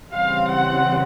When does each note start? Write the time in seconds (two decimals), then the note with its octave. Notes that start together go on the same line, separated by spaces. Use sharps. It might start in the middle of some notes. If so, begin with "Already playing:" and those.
0.11 C#3 E3 G3 C4 F5
0.53 F#5